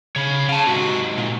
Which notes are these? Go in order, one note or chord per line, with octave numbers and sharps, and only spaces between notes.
C#3 C#5 B5
C#3 F5 A5
G#2 C3 F#4
A#2